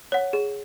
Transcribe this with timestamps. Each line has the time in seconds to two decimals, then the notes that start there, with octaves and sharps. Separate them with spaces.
0.12 C#5 F#5
0.33 G#4